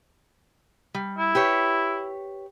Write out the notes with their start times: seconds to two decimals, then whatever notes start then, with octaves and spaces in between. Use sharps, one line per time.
0.95 G3
1.18 E4
1.35 G4 B4 C#5